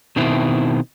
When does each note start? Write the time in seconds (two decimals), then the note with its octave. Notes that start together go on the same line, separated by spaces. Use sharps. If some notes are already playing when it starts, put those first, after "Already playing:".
0.16 B2 D#3 C4 E4